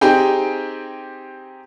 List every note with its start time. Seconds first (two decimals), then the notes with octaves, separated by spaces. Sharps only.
0.01 C4 D#4 G4 G#4 G5